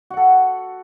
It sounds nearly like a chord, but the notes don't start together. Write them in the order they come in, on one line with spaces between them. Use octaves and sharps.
F#4 F#5 A4